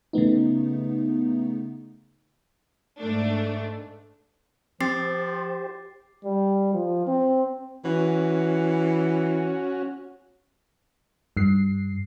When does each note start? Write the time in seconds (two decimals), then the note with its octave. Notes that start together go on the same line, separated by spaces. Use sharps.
0.13 C#3 A3 B3 D#4
2.99 G#2 A3 D4
4.81 F3 C4 G4 C5 D6 A6 C7
6.24 G3
6.74 F3
7.07 C4
7.85 E3 C#4 F#4
11.37 G2 C7